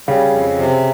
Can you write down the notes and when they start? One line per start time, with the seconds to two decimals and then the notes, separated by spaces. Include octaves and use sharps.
0.08 C#3 G3
0.33 F2
0.59 C3